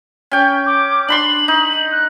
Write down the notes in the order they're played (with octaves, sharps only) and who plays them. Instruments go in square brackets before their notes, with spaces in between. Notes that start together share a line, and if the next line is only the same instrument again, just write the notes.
[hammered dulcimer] C#4 G5
[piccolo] D6
[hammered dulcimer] D4 B5 C6 [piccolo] F#7
[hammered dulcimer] D#4
[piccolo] F#6